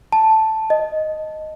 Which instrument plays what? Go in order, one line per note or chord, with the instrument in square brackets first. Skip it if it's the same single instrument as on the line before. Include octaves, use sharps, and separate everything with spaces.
[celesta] A5
D#5